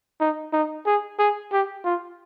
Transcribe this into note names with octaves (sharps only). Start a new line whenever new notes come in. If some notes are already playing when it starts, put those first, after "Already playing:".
D#4
D#4
G#4
G#4
G4
F4